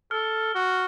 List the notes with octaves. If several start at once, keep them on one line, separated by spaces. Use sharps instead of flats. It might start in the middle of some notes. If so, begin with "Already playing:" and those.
A4 F6
F#4